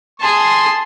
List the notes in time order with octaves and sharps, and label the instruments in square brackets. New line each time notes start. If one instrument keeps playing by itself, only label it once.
[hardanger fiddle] G#4 A5 [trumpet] C6